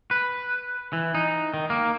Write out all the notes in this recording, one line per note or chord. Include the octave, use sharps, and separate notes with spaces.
B4
E3
D#4
D#3
A#3